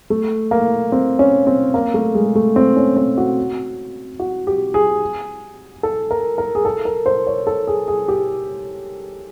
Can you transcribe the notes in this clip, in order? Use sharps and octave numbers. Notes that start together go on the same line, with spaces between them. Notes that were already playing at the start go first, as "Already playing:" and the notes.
A3
A#3
C4
C#4
C4
A#3
A3
G#3
A3
C4
C#4
C4
F#4
F#4
G4
G#4
A4
A#4
A#4
G#4
A4
A#4
C5
C#5
A4
G#4
G#4
G4